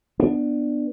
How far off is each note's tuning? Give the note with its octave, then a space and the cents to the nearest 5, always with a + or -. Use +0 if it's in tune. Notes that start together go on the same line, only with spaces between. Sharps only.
B3 +0 D4 +15